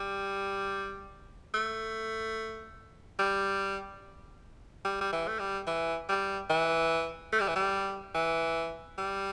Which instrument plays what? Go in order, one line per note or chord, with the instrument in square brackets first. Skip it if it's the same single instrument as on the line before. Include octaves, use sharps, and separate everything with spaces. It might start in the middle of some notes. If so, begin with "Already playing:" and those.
Already playing: [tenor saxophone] G3
A3
G3
G3
G3
E3
A3
G3
E3
G3
E3
A3
G3
E3
G3
E3
G3